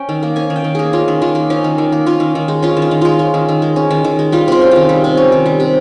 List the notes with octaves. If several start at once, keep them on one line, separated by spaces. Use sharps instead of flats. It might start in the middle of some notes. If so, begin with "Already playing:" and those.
Already playing: C#4 G5
D#3
A#3
C#4 G#5
D#3
G5
D#3
A#3 G#4
C#4 F4
D#3
D#3 F4
A#3
C#4 D#4
D#3
D#3
A#3
C#4 F4
D#3
D#3
G#3
C#4 F4
D#3
F4
D#3
G#3 F4
C#4
D#3
D#3
G#3
C#4
D#3
D#3
G#3
G3 F4
C3 F4
C#4
D#3 F4
G3
C3
C#4
D#3
G3
C3